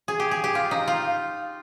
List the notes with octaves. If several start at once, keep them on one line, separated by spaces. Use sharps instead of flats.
G#4
G4
G#4
G4
F4
D#4
F4